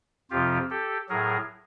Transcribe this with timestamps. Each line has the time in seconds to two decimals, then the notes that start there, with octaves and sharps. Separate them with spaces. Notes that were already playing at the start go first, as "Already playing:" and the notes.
0.31 F2 C3 F3 F4 G4
0.70 G4 A4
1.09 A2 F#3 G#4 A#4